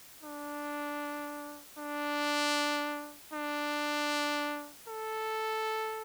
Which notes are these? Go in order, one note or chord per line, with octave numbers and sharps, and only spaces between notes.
D4
D4
D4
A4